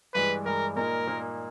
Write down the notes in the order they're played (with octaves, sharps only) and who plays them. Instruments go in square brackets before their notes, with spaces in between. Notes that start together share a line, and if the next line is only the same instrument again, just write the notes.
[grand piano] G2 E3 G#3 [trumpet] B4
[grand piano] G2 E3 G#3 [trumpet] A#4
[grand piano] A#2 A#3 D#4 [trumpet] A#4
[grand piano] A#2 A#3 D#4